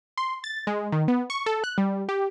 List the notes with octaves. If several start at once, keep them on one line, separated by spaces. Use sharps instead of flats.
C6
A6
G#3
D#3
B3
C#6
A4
F#6
G3
G4